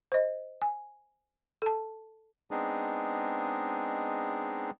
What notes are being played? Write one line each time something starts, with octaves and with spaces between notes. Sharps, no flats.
C5 D#5
G#5
A4 A5
G#3 B3 C4 D4 D#4 G#4